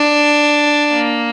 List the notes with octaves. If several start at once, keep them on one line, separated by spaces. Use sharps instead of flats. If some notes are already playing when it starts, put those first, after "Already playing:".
Already playing: D4
A#3